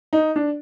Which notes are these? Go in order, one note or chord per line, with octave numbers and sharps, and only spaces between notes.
D#4
D4